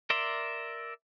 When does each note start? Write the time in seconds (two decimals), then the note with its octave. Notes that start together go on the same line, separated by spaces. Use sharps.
0.10 A#4 D5 E5 C6